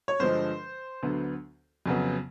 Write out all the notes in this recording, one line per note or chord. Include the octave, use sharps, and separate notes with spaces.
C#5
G2 D3 F3 G#3 C5
D2 D3 F#3 B3
F2 C#3 F#3 B3